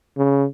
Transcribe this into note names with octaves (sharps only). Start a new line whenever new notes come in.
C#3